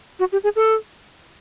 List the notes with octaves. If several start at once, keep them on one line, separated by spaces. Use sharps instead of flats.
F#4
G4
G#4
A4